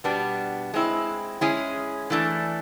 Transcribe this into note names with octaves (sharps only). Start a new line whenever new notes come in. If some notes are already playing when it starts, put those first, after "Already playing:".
B2 G3 B3 D4
G#3 C4 E4
G#3 C#4 E4 G#4
E3 A3 D4